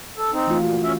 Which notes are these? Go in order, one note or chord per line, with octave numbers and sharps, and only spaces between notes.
A4
C4 D#4
E3 A3 F4
A#2 F#4
C#4 E5